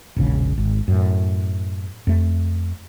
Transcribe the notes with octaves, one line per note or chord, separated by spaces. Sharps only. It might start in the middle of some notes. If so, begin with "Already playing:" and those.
E1 A#1 C#3
G#1
F#2 A2
F2 A3